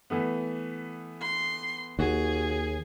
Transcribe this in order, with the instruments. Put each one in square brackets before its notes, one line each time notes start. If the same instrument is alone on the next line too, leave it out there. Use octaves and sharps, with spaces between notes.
[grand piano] E3 A3 B3
[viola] C6
[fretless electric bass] D#2 [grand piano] F#4 [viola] G#4